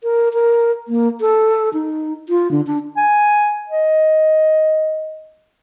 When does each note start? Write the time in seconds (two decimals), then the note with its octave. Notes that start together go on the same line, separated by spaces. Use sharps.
0.03 A#4
0.34 A#4
0.88 A#3
1.21 A4
1.73 D#4
2.29 F4
2.51 D3
2.67 D4
2.97 G#5
3.69 D#5